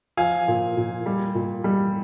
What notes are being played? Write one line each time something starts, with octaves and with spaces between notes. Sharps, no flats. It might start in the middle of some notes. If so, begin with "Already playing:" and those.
F3 F5 G#5
A#2
A#2
G3
A#2
G3